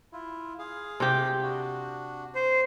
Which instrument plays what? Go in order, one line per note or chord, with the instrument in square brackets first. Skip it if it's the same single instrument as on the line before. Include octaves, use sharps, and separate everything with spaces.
[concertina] E4 F4
G#4 F5
[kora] C3 G4
[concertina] D4 F#4
[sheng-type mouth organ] C5